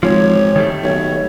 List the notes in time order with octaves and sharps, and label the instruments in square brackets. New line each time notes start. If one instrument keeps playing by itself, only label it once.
[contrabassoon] G#1 [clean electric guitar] F3 [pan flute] C#5
[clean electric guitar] D#3 G3 A3
[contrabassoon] B1 [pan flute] C#5